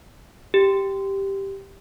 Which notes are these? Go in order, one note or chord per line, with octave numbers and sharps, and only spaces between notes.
G4